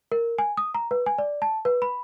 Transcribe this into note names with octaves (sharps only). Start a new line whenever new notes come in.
A#4
G#5
D#6
A#5
B4
G#5
D5
A5
B4
B5